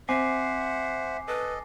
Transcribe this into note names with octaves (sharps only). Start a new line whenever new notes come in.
C4 C5 E5 F#5 G#5 D6 C7
A4 B4 D#5